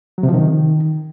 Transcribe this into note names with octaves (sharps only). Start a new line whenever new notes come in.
F#3
C3
F3
D#3